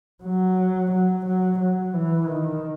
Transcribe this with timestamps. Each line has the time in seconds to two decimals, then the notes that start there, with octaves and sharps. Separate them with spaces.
0.24 F#3
0.92 F#3
1.26 F#3
1.60 F#3
1.94 E3
2.28 D#3